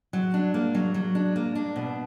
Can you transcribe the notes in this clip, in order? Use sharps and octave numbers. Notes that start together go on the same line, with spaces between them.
F#3
D4
A#3
F#3
F#3
D4
A#3
D4
B2